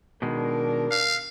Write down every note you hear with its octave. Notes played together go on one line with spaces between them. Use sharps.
B2 D#3 G#3 D4 A#4
F5